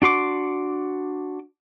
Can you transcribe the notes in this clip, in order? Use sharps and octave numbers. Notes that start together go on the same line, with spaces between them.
D4 F#4 C6 D6